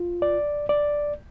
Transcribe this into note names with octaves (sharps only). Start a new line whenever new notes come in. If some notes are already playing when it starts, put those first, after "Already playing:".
Already playing: F4
D5
D5